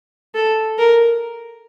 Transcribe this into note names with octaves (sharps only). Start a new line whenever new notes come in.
A4
A#4